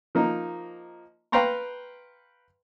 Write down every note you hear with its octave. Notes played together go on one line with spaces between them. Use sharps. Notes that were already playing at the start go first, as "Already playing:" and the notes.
F3 A#3 D#4
B4 F5 G5 A#5 C6 C#6